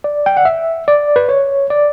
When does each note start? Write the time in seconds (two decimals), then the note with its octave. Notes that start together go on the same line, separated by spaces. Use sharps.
0.04 D5
0.26 G5
0.37 F#5
0.45 E5
0.88 D5
1.16 B4
1.29 C#5
1.70 D5